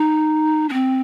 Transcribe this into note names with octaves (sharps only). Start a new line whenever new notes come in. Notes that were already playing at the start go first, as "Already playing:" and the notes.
Already playing: D#4
D4
C4